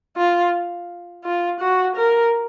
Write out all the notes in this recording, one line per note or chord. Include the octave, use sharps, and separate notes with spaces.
F4
F4
F#4
A#4